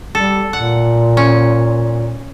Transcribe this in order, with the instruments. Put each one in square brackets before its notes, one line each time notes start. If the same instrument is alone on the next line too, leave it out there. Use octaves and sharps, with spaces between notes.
[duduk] G3 [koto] A4
[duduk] A#2 [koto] F#5
[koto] C#4